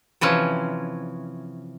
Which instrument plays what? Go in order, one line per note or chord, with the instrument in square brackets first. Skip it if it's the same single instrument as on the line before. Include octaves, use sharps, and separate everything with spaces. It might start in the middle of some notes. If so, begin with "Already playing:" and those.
[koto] C3 E3 F3 C#4